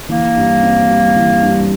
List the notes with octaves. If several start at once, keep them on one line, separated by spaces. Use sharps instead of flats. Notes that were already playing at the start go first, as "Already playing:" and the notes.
E3 A#3
G2
C4
G3
E3
G2